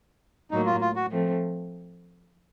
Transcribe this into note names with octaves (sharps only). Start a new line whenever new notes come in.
A2 F#3 A#3 D#4
F4
F4
F#4
F3 A3 C4